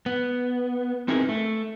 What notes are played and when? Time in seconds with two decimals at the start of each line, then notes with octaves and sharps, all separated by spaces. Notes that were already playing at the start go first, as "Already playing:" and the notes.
0.06 B3
1.08 C4 D#4 E4 G#4 A#4 B4
1.29 A3